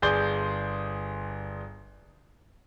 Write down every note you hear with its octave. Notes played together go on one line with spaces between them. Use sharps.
G1 G#4 D5 C6 G6 G7